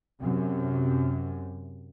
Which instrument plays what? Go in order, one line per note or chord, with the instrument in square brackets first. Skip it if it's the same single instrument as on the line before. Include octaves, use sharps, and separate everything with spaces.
[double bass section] F#2 C3